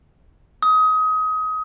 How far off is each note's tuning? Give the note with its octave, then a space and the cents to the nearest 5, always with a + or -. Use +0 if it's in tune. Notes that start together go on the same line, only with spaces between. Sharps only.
D#6 +25